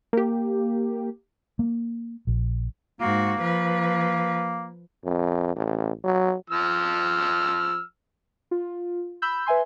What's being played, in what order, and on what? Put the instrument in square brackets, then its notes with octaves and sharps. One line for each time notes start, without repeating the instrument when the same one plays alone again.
[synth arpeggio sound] A#3 G4
[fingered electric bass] A#3
A#1
[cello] G#2 F#4 [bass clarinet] A#3
[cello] F3 B4
[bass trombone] F2
A1
F#3
[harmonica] F3 E6 F6
[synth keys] F4
B5 E6 G6
B4 E5 G#5 C6